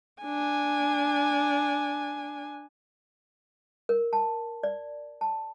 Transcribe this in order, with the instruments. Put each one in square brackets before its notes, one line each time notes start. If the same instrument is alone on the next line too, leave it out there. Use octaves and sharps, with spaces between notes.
[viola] D4 G#5
[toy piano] A#4
A5
D5
A5